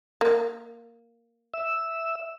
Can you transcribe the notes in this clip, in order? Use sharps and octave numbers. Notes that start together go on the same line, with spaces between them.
A#3
E5 E6